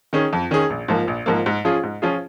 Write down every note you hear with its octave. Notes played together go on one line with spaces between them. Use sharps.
D#3 C#4 G#4
F2
D#3 C#4 G#4
A#1
G#2 F3 A#3
A#1
G#2 F3 A#3
G#2
F3 C#4 F4 G#4
G#2
F3 C#4 F4 G#4